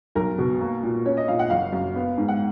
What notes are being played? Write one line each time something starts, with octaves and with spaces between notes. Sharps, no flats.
B1 A#4
B2
A#3
A#2
C#4 C#5
D#5
A#2 F5
F#5
F#1 F5
F#2
B3
G#2
F#5